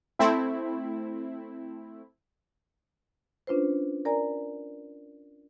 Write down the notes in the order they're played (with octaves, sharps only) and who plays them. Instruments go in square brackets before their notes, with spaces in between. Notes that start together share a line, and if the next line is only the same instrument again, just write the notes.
[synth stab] A3 C4 E4
[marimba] C#4 D4 F4 B4 C5
A#4 D5 G#5 A#5